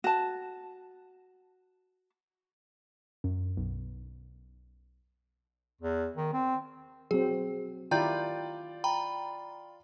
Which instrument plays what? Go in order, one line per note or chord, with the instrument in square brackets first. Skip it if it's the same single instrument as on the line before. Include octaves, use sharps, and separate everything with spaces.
[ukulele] F#4 A5
[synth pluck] F#2
B1
[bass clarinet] E2
D#3
C4
[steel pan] F#3 C4 [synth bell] G#4
[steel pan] D#3 E4 G4 [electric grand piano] F4 D5 [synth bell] G5 A#5 G6
[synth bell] G5 A#5 B5